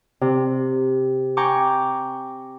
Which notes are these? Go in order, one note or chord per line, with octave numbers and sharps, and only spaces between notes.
C3
G5 G#5 A#5 C#6 D6